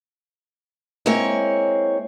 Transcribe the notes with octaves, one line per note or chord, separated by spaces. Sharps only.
G#3 A#3 C4 E4 C#5